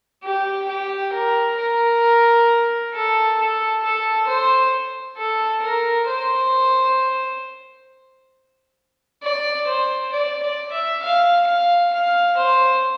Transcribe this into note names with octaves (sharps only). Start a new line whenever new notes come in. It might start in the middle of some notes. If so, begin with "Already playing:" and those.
G4
G4
A#4
A#4
A4
A4
A4
C5
A4
A#4
C5
D5
C5
D5
D5
E5
F5
F5
F5
C5